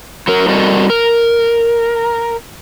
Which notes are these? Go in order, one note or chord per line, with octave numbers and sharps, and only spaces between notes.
F#3 A#4
G3 C4 F#4 A4 A#4 D#5
A#4